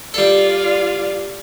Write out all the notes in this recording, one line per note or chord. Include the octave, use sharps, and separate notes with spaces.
G3 F4 A4 D5 F5